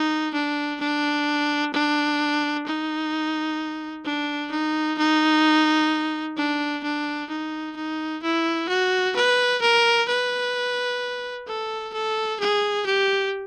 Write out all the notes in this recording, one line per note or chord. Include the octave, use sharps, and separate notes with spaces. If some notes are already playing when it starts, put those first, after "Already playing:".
Already playing: D#4
D4
D4
D4
D#4
D4
D#4
D#4
D4
D4
D#4
D#4
E4
F#4
B4
A#4
B4
A4
A4
G#4
G4